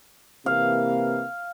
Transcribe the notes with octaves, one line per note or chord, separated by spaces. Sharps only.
C3 E3 A#3 F5